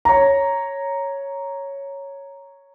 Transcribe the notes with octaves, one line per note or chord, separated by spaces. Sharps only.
C#5 A#5